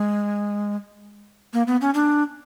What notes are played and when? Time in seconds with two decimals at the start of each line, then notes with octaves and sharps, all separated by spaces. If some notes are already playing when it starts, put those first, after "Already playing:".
Already playing: G#3
1.53 A#3
1.67 B3
1.81 C#4
1.94 D4